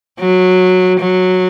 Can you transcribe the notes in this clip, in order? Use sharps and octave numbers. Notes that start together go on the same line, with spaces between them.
F#3
F#3